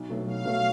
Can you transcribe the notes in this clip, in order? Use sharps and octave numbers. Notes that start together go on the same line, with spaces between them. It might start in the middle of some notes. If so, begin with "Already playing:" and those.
Already playing: B1
B2 F#3 A3
B1 F5
B2 F#3 A3